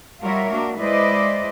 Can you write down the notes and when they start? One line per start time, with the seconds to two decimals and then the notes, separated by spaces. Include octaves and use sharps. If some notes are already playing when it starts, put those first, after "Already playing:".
0.21 G3 F4 F#4 A#4 C#5 E5
0.50 A#3 D4 F#4
0.78 G#3 E4 B4 C5 D5 D#5